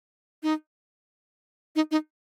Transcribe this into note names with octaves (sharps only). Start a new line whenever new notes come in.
D#4
D#4
D#4